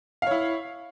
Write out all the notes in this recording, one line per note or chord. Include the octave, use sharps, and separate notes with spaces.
E4 C#5 F5